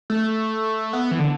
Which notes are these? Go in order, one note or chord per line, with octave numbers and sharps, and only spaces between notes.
A3
B3
E3
D3